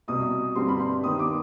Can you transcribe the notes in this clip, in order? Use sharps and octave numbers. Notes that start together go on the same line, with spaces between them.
C2 B2 B3 D#6
G2 D3 G3 C4 C6
B5
C6
D#2 D#3 B3 D#6
D6